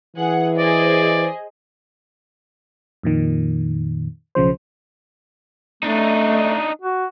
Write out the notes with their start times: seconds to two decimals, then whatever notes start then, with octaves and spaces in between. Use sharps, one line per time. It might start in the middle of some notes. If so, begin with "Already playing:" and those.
0.16 E3 G#4 F#5
0.58 G#4 C5 D5 D#5
3.03 F2 A#2 D#3
4.35 B1 C#3 F3 C5
5.83 A3 D4 D#4
6.81 F#4